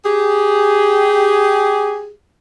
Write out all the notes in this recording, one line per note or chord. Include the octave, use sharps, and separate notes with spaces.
G4 G#4